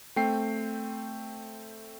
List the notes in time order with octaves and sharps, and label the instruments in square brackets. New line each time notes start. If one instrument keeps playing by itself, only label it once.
[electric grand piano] A3 C4 G5 C7